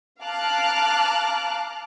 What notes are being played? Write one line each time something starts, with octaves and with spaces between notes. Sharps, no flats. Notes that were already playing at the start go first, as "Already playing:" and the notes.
F5 A5 A#5 D6 F6 F#6